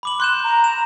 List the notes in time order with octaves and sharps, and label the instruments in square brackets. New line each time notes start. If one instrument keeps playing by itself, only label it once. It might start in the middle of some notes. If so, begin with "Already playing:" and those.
[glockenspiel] B5 D6 F#7
[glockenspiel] C6 G6 E7 [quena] F#6
[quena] A#5
[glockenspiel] E7